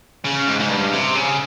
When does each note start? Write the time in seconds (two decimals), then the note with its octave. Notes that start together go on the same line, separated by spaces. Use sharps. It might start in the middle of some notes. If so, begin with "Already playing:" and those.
0.25 C#3
0.48 G#2
0.60 G#2
0.70 G2
0.93 C3
1.15 C#3